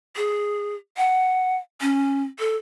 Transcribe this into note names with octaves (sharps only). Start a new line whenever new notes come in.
G#4
F#5
C#4
A4